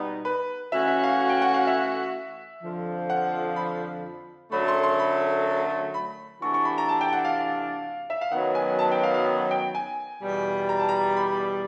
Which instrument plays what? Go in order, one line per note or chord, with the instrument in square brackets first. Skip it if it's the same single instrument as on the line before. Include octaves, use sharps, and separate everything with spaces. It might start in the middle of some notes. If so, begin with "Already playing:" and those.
Already playing: [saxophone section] B2 G3 B3 D#4
[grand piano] B4
[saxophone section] E3 A3 C#4 F#4 [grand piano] E5
[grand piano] E5
F5
G5
F#5
F5
E5
[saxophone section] F2 D3 F3
[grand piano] F#5
B5
[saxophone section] F#2 D3 F#3 A3 [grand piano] B5
[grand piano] C6
C6
B5
B5
[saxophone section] C3 E3 A3 D4 F#4 [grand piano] C#6
[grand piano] C#6
B5
A#5
A5
G5
F#5
F5
E5
F5
[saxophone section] F#2 D#3 F#3 B3 [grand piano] F#5
[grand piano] G#5
A5
G5
F5
F5
G5
G#5
[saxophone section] E2 B2 G3
[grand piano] A#5
A5
A#5
B5